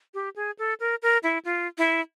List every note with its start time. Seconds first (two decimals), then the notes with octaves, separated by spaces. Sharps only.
0.14 G4
0.36 G#4
0.59 A4
0.80 A#4
1.02 A#4
1.23 E4
1.45 F4
1.78 E4